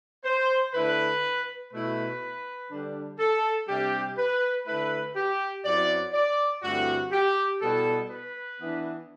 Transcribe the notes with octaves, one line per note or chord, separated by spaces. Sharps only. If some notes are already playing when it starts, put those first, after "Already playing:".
C5
D3 A3 E4 B4
B2 A3 E4 B4
D3 G3 D4
A4
C3 G3 D4 G4
B4
D3 A3 E4 B4
G4
F#2 F#3 C4 E4 D5
D5
G2 D3 A3 C4 E4 F#4
G4
B2 G3 B3 E4 A4
B4
E3 B3 D4